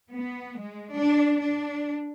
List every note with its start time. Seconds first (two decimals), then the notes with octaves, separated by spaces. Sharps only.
0.13 B3
0.60 G#3
0.95 D4
1.41 D4